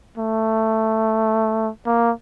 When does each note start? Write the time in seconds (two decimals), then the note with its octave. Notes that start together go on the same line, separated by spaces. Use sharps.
0.18 A3
1.86 A#3